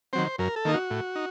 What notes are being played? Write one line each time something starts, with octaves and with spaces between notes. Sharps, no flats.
D#3 F#3 C4 C5
F#2 A#4
A4
D#3 A#3 D#4
F#4
A2
D#4